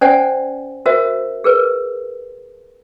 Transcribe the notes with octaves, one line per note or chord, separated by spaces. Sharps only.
C#4 C5 D5 F#5 G#5
F#4 A#4 C5 E5 F5
G#4 A#4 B4